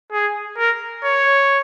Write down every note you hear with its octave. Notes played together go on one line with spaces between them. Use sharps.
G#4
A#4
C#5